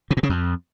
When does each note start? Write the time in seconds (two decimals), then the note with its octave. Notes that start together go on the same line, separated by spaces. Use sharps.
0.11 C3
0.17 A#2
0.23 C#3
0.29 F2